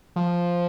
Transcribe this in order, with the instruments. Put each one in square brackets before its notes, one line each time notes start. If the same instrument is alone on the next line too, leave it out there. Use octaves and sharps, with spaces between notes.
[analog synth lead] F3